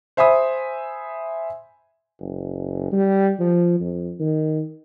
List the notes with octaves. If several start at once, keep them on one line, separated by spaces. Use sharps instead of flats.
C5 E5 G#5 B5 D#6
F#1
G3
F3
F2
D#3